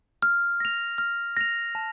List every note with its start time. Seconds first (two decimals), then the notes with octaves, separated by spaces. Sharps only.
0.22 F6
0.60 A#6 F7
0.98 F6
1.37 A#6 F7
1.75 A5